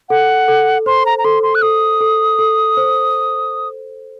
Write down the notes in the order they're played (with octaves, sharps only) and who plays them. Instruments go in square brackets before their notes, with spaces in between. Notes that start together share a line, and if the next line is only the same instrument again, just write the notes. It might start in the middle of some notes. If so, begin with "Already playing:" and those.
[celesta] A4 [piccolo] F#5
[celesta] A4
[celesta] C5 [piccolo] C6
[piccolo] A#5
A#5
[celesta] A4 [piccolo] C6
[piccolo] C6
F#6
[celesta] A4 [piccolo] D#6
[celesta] A4
A4
C5